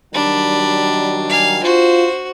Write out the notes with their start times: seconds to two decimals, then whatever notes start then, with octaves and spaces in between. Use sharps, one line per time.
0.14 D#3 F#3 G3 D4 B5
1.29 F5 G#5
1.64 F4 F#4 C5